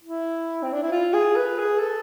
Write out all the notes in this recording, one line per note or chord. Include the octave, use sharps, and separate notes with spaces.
E4
C4
D4
E4
F4
G#4
B4
G#4
A4